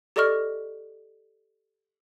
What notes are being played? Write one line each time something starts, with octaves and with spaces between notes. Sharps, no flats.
G4 A4 D5 D#5 C#6 F6